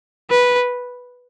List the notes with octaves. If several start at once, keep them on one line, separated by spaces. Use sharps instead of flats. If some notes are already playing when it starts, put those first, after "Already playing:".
B4